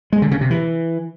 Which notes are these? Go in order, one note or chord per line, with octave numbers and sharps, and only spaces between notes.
G#3
D3
C#3
C3
E3